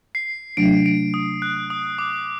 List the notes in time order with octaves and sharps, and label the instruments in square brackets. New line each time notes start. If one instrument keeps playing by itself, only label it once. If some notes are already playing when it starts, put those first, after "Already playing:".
[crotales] C7
[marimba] C3 F#3 A3 D4 [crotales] D7
[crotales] D7
D#6
F#6
D#6
D6